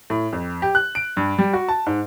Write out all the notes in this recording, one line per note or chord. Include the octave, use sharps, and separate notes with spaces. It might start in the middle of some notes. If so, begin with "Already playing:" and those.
A2
F2
G4
F#6
D7
G2
G3
F#4
A5
G#2